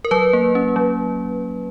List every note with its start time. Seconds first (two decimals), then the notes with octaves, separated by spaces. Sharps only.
0.05 A#4
0.11 F#3 B4
0.33 A#3
0.55 C#4
0.76 F#3